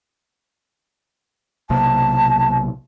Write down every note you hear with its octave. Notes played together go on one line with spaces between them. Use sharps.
B1 C3 A#3 A5